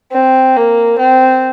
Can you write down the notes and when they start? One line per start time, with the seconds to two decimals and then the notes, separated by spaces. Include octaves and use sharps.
0.13 C4
0.57 A#3
0.99 C4